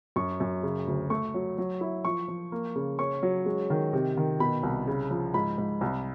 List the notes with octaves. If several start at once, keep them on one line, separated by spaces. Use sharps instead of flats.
F#2 C#6
F#2
C#3
D2
A3 C#6
F#3
F#3
E4
F3 C#6
F3
A#3
C#3
C#4 C#6
F#3
G#3
D#3
C3
D#3
B2 B5
C2
C#3
F3
G#2 B5
G#2
C2